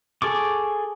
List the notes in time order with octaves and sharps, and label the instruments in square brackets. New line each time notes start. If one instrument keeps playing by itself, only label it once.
[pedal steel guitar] G#4 A4 C#6 D6